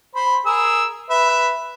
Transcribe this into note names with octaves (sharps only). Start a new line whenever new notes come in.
C5 B5
G#4 A#4 E6
B4 E5